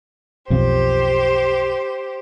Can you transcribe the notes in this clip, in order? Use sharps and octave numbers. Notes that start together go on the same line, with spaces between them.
B1 F2 G4 C5